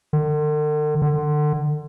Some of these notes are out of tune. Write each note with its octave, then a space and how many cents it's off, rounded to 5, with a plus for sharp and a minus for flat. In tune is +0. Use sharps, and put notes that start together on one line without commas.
D3 +45
D3 +30